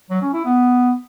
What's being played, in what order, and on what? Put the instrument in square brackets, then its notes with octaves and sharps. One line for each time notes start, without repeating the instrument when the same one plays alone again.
[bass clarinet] F#3
C#4
E4
B3